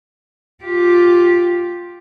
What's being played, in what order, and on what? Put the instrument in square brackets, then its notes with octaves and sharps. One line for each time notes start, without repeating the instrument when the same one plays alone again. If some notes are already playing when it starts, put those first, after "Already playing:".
[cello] F4 G4